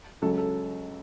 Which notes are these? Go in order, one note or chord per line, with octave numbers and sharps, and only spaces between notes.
C#2 C#3 F#3 A4
A4